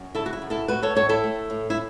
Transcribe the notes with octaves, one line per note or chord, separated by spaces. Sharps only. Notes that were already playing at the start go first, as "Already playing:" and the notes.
Already playing: F#2
C#3 E4 A4
F#4
E4
F#2
E4 A4
A3 F#4 B4
A4 C#5
A2 A4 C#5
E4 A4
A3
A2
E4